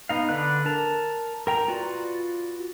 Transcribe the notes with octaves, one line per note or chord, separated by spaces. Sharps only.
B3 D#4 F5
D3 D4 B4 F#6
A#4 A5
A#4 G5 A#5
F4 F#4 B4 D5